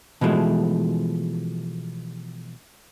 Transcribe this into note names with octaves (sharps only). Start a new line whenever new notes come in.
B2 E3 F3 G#3 A3